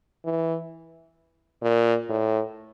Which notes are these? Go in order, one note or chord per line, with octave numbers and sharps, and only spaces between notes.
E3
A#2
A2